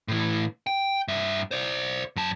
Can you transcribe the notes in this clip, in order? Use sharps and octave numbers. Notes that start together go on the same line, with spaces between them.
A2 E3
G5
G2 E5
C5 D5
F#2 A5